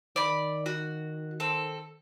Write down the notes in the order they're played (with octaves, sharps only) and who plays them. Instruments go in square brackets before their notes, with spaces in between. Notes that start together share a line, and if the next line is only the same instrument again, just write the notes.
[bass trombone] D#3 [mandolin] D5 B5
[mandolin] F#4
C4 A4